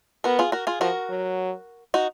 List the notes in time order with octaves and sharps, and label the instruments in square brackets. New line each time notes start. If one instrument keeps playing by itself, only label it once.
[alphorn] B3 [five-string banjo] F#4 A#4
[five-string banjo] F4 G#4
F#4 A#4
F4 G#4
[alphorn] F3 [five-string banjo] F#4 A#4
[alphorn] F#3
[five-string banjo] D#4 F#4